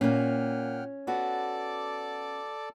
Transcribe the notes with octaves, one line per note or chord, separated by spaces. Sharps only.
A#2 A#3 C#4 F#5 G5 F6
B3 F#4 A4 D5 D6